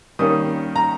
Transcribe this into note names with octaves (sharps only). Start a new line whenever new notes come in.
D#3 G3 A#3 C#4 D#6
A#5